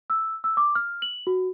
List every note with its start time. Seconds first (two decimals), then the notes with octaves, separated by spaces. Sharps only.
0.10 E6
0.44 E6
0.57 D6
0.75 F6
1.02 F#7
1.27 F#4